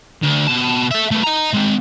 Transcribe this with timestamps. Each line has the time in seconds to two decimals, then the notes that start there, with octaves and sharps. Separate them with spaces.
0.23 D2
0.48 B2 A5
0.91 A4 E5
1.11 A3 B3
1.24 D#5 A#5
1.54 G#3 C4